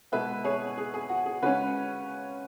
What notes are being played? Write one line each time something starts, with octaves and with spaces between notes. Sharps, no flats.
B2 G#3 B3 B4 E5
G#4 C#5
G#4
G#4
F#4
G#4
C#3 G#3 C#4 F#4 B4